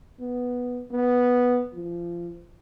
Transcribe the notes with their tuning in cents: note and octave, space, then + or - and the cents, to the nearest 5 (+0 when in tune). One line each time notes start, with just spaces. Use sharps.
B3 +0
B3 -5
F3 -25